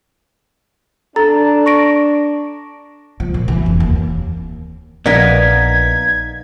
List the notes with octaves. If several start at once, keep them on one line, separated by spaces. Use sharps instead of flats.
D4 A4 A#5 A6
C#6 A#6 D7
F3
A#2
E3
F1
D#2
A#1 B3 D#4 A#4 D5 F5 G#6 B6